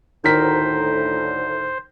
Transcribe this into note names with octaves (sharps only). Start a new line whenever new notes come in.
D2 A2 D#3 A#4 C5 B6